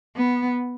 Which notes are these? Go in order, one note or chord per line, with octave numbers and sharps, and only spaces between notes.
B3